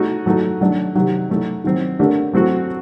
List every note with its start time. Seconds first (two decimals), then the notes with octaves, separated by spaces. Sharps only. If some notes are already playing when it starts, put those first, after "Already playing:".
Already playing: A3 D#4 F#4 A4
0.26 F#3 A3 D#4 F#4 A4
0.61 D#3 F#3 A3 D4
0.95 C3 D#3 F#3
1.30 F#3 A3 D#4
1.64 D#3 F#3 C4
1.99 D3 A3 D4 G4 A#4
2.33 F#3 A3 C4 F#4